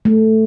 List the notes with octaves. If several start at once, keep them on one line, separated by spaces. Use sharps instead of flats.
A3